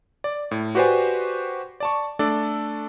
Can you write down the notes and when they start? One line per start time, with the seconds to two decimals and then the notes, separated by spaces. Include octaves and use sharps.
0.24 D5
0.51 A2
0.75 F#4 G4 B4 C5 D5 G#5
1.80 D5 A5 C#6
2.19 A3 D4 A4 D5